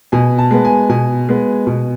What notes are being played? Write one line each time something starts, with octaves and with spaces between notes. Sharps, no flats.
B2 G#5
A5
G#3 B3
G#5
B2 G#5
G#3 B3
B2